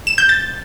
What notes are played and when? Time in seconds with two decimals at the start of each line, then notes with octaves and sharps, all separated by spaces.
0.07 E7
0.18 G6
0.29 A6